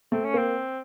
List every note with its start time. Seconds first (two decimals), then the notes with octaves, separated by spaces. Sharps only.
0.12 A3 C4
0.25 C#4
0.34 A#3 C4